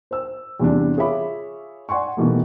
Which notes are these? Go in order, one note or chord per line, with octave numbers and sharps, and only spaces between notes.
C5 E6
E2 C3 E3 G3 D4
F4 G#4 C#5 E5 B5 D6
D5 F#5 G#5 C6 C#6
B2 D#3 E3 G3 A3